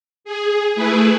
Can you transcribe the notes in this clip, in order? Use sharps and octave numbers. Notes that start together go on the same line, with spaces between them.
G#4
A3 E4 G#4 B4